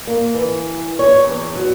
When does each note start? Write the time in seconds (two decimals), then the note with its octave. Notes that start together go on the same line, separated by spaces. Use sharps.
0.07 A#3
0.34 E3
0.99 C#5
1.24 E2
1.55 F#3